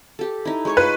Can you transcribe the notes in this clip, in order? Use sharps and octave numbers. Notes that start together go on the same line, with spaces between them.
G4 A4
D#4 E4
G#3 C#5 C#6
F4 B4